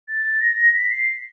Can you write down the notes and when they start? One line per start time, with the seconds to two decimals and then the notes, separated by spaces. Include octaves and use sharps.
0.08 A6
0.41 A#6
0.74 B6
0.90 C7